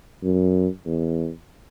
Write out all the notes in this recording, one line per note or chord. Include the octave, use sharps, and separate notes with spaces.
F#2
E2